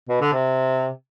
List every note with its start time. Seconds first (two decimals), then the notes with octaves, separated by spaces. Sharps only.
0.09 B2
0.21 D3
0.33 C3